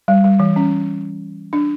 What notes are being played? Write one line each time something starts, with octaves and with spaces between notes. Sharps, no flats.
G3
G3
E3
C#4
D4